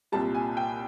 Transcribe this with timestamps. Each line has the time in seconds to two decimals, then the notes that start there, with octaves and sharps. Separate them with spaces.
0.12 C2 A#2 G3 A5
0.34 G#5
0.57 G5